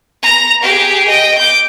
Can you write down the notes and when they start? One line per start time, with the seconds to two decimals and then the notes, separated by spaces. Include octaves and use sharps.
0.23 A#5
0.62 G4 G#4
1.08 D#5 G5
1.38 D6 G6